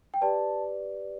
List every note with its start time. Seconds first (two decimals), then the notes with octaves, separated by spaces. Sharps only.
0.14 G5
0.21 G4 B4 D5 A5